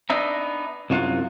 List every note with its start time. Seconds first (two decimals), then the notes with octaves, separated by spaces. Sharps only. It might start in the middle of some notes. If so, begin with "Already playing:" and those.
0.10 B3 D4 D#4 E5 A#5
0.90 C2 F#2 F#3 F4 F#5